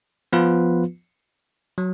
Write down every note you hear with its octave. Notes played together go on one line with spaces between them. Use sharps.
F3 B3 F4 B4
F#3